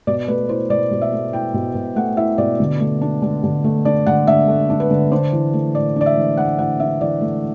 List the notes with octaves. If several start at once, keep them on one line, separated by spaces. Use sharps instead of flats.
B2 D5
A3 B4
E4 C5
B2 D5
B2
E5
A3
E4 G5
B2
B2
A3 F#5
E4 E5
B2 D5
D3
A3
D4
D3
D3
A3
D4 D5
D3 F#5
D3 E5
A3
D4
B4
D3
D4 C5
E3
A3
A2 D5
D4 D5
E5
E3
A3 F#5
A2 F#5
D4 E5
E3 D5
A3